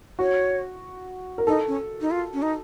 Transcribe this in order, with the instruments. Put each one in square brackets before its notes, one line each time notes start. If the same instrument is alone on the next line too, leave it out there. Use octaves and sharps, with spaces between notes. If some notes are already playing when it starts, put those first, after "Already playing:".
[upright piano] F#4 [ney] C#5
[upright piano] A#4
[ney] D#4 [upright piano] A4
[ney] C#4
D#4
F4
C#4
D#4